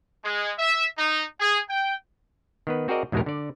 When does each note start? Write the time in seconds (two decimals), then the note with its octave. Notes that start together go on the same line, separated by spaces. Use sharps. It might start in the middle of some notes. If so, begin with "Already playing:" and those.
0.25 G#3
0.58 E5
0.98 D#4
1.39 G#4
1.69 G5
2.67 D#3 B3 B4
2.88 C4 F#4 G#4 A#4 D5 D#5
3.12 E2 G#2 B2 G#3 D#4 A#4
3.26 D3 D5